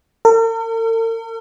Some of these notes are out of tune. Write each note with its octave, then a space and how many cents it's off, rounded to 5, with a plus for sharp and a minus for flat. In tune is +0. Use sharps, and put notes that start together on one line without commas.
A#4 -45